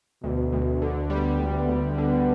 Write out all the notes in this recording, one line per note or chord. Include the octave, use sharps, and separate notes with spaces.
D2 B2
D2
D3
G3 B3
D2
B3
D2
D3 B3